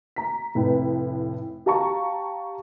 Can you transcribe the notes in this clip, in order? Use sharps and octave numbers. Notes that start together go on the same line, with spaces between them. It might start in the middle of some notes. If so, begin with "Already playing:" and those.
A#5 B6
F1 A2 B4 G5
G4 F5 A5 A#5 C#6